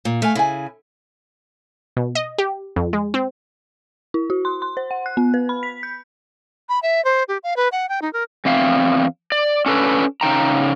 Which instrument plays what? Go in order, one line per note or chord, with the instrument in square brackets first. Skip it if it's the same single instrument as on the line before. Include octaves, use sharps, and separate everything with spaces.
[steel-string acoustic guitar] A#2
[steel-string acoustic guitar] A3 [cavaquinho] E5 F5 G#5
[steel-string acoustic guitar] C#3 [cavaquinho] E4 G#5
[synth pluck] B2
D#5
G4
F2
G#3
C4
[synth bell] E4
F#4
C6
C6
C5
F#5
F#6
B3
B4
B5
B6
G6
[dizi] B5
E5
C5
G4
F5
B4
F#5
G5
D#4
A#4
[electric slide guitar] E2 C4 E5 F5
D5
C#4 D4 A4 B4
C#3 D#4 G5 A#5